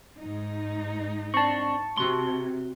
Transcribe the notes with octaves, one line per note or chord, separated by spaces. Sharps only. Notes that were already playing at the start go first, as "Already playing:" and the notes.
G#2 D#4
C4 D4 A5 C#6
C3 C4 F#4 C6